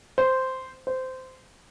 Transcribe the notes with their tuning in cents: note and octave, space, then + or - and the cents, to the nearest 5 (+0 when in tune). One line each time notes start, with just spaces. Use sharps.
C5 -5
C5 -15